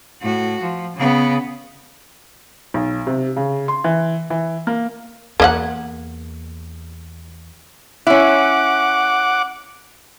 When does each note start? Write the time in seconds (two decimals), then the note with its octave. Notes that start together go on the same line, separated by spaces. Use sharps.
0.22 A2 F#4
0.61 F3
0.96 C#3 B3
2.74 B1
3.07 C3
3.36 C#3
3.68 C6
3.84 E3
4.30 E3
4.67 A#3
5.40 E2 A#3 D#5 F#5
8.07 C#4 E4 F#5 D6